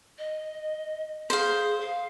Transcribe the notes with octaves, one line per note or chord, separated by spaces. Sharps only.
D#5
G#4 C5 F5
F5